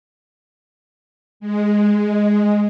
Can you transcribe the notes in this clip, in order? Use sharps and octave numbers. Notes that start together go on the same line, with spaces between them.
G#3